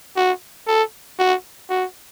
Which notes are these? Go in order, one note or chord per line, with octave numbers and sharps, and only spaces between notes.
F#4
A4
F#4
F#4